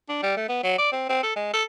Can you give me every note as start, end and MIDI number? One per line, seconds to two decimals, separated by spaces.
0.09 0.22 62
0.23 0.36 55
0.37 0.47 57
0.49 0.60 59
0.63 0.77 54
0.78 0.91 74
0.92 1.09 60
1.09 1.22 60
1.23 1.34 69
1.36 1.50 56
1.53 1.63 69